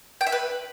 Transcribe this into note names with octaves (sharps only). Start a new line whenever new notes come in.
G5
E5
B4